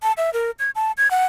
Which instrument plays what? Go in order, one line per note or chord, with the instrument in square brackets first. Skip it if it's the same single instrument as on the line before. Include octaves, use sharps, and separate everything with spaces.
[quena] A5
E5
A#4
G#6
A5
G#6
F#5